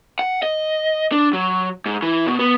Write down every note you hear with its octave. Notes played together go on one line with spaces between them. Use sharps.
F#5
D#5
D4
F#3
G#2
E3
B2
B3